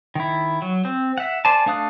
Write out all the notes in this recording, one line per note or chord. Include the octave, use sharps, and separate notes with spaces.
D#3 E4
F#3
C4
E5 F#5
C5 D5 G#5 A5
A3 D4 F5 D#6 F#6